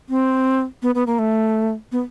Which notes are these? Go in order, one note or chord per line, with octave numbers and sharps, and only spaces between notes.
C4
B3
B3
A#3
A3
B3